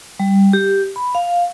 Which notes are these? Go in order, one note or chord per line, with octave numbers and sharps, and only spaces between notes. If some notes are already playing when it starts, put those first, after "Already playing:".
G3
G4
B5
F5